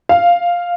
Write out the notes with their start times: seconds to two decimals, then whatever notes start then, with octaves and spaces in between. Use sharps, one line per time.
0.09 F5